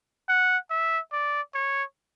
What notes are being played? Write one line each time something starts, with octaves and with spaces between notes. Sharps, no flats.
F#5
E5
D5
C#5